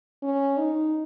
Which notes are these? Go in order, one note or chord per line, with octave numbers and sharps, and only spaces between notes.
C#4
D#4